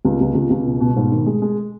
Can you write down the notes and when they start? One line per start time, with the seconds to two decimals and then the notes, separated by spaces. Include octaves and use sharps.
0.05 C#2
0.21 C#2
0.35 C#2
0.50 C#2
0.66 B2
0.80 B2
0.96 G#2
1.12 D#3
1.26 G#3
1.42 G#3